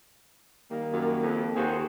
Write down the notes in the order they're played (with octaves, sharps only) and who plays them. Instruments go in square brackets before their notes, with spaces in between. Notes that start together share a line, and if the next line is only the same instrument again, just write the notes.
[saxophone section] D#3 G3 A#3
[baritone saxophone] F#2
F2
[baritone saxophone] D#2 [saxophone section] F#4 G#4 C5